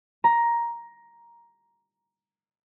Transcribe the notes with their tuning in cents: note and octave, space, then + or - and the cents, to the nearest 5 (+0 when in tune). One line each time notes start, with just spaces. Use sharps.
A#5 +10